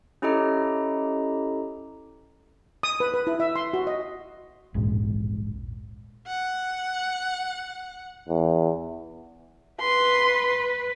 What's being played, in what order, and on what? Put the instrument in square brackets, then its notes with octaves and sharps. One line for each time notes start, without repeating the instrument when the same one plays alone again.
[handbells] C#4 E4 G4 A4 D#5 A#5
[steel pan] D#6
B4
B4
E4
E5
C6
F#4
D#5
[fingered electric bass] E1 A#1 G#2
[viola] F#5
[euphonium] E2
[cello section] B4 [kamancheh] C6